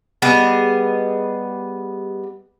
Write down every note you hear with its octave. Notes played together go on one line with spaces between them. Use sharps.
G3 B3 G#4 D#5